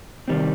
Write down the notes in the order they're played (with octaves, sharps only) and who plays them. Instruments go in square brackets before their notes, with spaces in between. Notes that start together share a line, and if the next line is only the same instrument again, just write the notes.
[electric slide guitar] C3 D#3 G3 C4